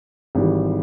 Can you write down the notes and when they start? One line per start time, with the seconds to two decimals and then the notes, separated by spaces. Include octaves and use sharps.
0.35 G#1 G#2 E3 G3